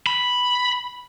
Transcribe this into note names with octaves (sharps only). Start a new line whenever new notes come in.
B5